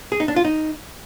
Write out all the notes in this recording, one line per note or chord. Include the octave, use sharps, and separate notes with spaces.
G#4
D#4
D4
F4
D#4